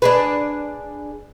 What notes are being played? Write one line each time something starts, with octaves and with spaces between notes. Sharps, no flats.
D4 G#4 B4